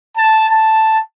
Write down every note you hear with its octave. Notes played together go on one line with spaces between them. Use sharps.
A5
A5